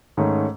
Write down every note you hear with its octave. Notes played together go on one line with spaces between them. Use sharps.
G#2 D#3 A3 C#4